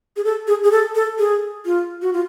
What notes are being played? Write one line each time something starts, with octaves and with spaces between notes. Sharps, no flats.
G#4
A4
G#4
G#4
A4
A4
G#4
F4
F#4
F4